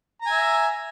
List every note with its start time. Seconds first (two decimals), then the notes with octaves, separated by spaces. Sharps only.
0.22 A#5
0.27 G#5
0.31 E5